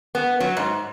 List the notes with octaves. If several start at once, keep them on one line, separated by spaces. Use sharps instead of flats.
B3
F#3
G#2